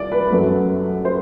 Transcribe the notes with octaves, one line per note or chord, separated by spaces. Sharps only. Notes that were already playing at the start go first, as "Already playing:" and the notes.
Already playing: C2 D5
B4
F#2 F#3 A3
C5